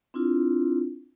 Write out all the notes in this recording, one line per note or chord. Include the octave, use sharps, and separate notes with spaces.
C4 D4 E4 F4